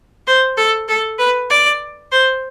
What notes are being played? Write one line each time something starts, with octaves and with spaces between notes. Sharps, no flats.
C5
A4
A4
B4
D5
C5